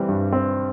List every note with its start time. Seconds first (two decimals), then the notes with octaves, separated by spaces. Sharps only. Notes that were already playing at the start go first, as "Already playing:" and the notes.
Already playing: E3 G3 C4
0.09 G2
0.32 C4